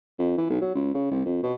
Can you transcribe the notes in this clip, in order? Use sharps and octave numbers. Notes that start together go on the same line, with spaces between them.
F2
E3
B1
F#3
C#2
C#3
C2
F2
B2